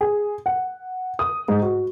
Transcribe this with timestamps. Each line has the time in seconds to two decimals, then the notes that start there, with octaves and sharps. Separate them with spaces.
0.01 G#4
0.46 F#5
1.19 D#6
1.48 G#2
1.62 F#4